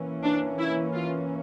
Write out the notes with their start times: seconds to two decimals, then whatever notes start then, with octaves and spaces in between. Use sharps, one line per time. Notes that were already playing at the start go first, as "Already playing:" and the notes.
Already playing: E3 A#3 C#4
0.23 D4
0.59 E4
0.94 F4